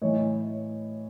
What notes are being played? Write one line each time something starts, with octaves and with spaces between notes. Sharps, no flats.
A2 E3 C#5 D#5